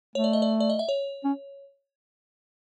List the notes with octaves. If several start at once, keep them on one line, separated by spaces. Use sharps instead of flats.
A3 C#5
D5
D#5
D5
D5
D#5
E5
C#5
C#4